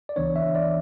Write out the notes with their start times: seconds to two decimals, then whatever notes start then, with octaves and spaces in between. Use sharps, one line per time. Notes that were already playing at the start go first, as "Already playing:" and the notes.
0.09 D5
0.16 C#2 C#3 E3 B3 D4 C#5
0.36 E5
0.55 D5